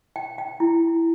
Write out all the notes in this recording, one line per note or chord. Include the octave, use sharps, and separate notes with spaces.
G5
G5
E4